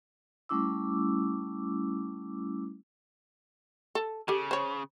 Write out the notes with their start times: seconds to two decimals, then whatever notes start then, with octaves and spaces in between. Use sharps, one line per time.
0.49 G3 A3 C#4 E4 D6 E6
3.95 A4
4.28 C#3 G4 A4
4.51 C5 C#5